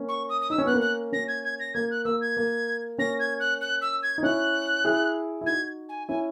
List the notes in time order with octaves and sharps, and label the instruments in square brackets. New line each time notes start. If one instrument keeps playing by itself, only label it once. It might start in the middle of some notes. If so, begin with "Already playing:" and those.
Already playing: [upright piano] A#3 C#4
[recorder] C#6
D#6
D#6
[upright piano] D#4 [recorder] E6
[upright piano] C#4
[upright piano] B3 [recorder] F#6
[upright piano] A#3 C#4
[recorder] F#6
[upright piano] A#3 C#4 [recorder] A#6
[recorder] G#6
G#6
A#6
[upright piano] A#3 [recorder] G#6
[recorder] F#6
[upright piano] A#3 [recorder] E6
[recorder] G#6
[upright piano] A#3
[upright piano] A#3 C#4 [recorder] A#6
[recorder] G#6
F#6
F#6
E6
G#6
[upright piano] D#4
[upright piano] C#4 E4 [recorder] F#6
[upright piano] E4 G#4
E4
[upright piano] D#4 F#4 [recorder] G#6
[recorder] G#5
[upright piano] C#4 E4 [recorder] G#5